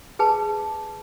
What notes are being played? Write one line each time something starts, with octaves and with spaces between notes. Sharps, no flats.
G#4 B4 A5